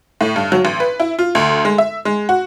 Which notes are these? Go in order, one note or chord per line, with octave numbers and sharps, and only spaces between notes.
A2
G2
F#3
A1
B4
E4
F4
D2
G#3
E5
G#3
F#4